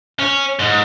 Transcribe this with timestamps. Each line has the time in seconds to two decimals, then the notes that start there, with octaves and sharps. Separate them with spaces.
0.19 C#4
0.59 G#2